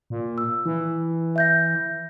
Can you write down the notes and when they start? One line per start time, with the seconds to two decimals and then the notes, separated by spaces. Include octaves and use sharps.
0.10 A#2
0.38 E6
0.65 E3 E4
1.36 E5 G6 A#6